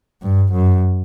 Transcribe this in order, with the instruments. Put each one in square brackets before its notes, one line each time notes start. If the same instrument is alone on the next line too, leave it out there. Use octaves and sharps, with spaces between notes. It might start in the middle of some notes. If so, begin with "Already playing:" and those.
[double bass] G2
F#2